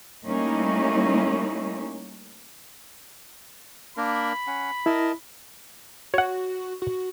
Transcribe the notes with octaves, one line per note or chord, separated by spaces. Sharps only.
G3 A3 A#3 C#4 D#4 E4
A#3 D4 A#4 B5
C#4 F#5
E4 A#4 D#5 A5
F#4 C#5 F#5
F#4